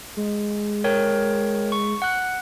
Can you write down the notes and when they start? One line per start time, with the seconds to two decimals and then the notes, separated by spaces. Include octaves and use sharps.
0.17 G#3
0.84 A#4 C#5 G5
1.72 C#6
2.02 F#5 F#6